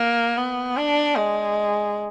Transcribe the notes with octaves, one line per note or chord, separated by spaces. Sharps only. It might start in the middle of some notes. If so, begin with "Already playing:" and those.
Already playing: A#3
B3
D4
G#3